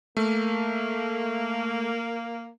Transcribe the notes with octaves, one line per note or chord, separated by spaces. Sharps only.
A3 A#3